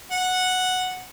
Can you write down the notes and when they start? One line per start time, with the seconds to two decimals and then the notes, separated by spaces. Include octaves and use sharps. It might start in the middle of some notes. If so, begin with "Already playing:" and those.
0.12 F#5